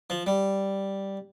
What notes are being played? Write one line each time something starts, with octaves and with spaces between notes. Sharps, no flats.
F3
G3